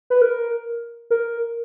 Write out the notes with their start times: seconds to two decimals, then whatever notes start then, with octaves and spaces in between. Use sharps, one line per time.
0.10 B4
0.22 A#4
1.10 A#4